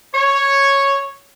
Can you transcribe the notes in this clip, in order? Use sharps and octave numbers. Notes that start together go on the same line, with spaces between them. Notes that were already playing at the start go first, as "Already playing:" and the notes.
C#5